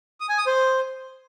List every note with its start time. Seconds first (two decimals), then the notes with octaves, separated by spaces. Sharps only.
0.20 D#6
0.29 G#5
0.38 D#6
0.47 C5